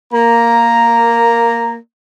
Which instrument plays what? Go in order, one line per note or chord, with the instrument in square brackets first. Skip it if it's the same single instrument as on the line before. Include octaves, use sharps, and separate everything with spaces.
[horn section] A#3 A#5